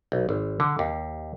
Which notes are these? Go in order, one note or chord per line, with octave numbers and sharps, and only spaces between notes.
B1
G#1
D3
D#2